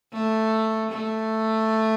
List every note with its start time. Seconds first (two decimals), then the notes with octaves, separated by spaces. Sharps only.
0.13 A3
0.91 A3